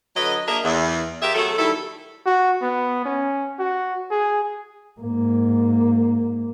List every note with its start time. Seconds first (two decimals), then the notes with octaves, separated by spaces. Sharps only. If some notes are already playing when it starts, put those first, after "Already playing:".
0.16 D3 F#3 B4 D#5
0.47 A#3 D4 G#4 A#4 D#5 E5
0.64 E2
1.22 F4 G4 G#4 A#4 E5
1.35 B2 F#3 A3 G#4 A4
1.58 D#3 G3 E4 A4
2.26 F#4
2.62 B3
3.05 C#4
3.59 F#4
4.11 G#4
5.00 G#2 A#3